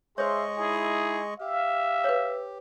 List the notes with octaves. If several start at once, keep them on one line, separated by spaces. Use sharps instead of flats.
G#3 G#4 C5 C#5 D#5 E5 C6 C#6
D#4 E4 G#4
G4 E5 F5
B4 C#5